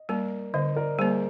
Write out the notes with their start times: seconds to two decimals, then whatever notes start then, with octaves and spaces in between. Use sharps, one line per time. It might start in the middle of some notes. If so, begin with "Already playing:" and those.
Already playing: D#5
0.09 G3 A#3 A#4 D5
0.54 D3 C5 D#5
0.76 A#4 D5
0.98 G3 G#4 C5
1.01 A#3